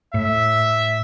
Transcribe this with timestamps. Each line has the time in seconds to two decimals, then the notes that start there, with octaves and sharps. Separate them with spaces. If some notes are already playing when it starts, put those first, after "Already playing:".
0.14 A2 E5